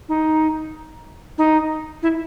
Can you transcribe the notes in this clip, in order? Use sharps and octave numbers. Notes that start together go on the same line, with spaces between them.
D#4
D#4
E4